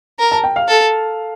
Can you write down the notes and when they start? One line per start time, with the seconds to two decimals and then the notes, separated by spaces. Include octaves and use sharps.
0.19 A#4
0.32 A5
0.44 G5
0.56 F5
0.68 A4